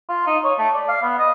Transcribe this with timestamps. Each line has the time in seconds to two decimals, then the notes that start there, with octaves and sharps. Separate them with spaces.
0.09 F4
0.27 D#4
0.44 C#5
0.59 A3
0.74 D5
0.88 F5
1.02 B3
1.19 D#5